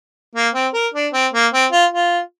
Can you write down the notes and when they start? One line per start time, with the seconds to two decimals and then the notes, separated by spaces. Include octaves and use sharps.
0.35 A#3
0.54 C4
0.74 A#4
0.94 D4
1.13 C4
1.33 A#3
1.52 C4
1.72 F4
1.92 F4